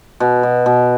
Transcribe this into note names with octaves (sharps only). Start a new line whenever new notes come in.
B2
B2
B2